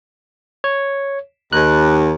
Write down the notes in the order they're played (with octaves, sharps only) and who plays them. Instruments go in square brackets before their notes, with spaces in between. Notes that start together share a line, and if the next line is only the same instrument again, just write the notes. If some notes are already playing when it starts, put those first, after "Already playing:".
[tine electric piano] C#5
[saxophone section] D#2 [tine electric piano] F#6